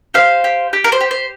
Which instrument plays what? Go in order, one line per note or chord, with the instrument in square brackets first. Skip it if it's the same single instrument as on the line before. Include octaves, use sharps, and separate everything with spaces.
[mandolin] G4 C5 F5
G4
G4
A#4
C5
G4
C5